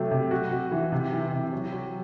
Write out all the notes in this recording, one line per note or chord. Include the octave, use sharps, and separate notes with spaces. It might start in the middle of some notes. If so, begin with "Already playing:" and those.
Already playing: C3 F#3 A3
C3
F#4
F#4
E3
C3
E3
C3
F#3
F#3